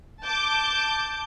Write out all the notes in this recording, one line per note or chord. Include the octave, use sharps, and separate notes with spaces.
A5 D6 G6